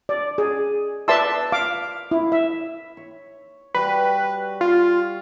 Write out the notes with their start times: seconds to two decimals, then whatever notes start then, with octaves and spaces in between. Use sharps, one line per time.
0.09 D5
0.38 G#4
1.08 B4 D5 E5 A5 C6 E6
1.52 F5 D6
2.11 E4
2.32 E5
2.97 C#5
3.74 G3 F#4 G4 B4
4.61 F4